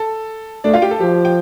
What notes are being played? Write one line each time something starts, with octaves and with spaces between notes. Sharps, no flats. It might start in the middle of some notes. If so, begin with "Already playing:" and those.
Already playing: A4
A3 D4 D5
F4 F5
G4 G5
A4
F3 G4
G5